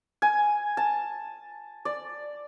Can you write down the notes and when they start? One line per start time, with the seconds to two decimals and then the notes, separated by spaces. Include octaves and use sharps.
0.22 G#5
0.77 A5
1.85 D5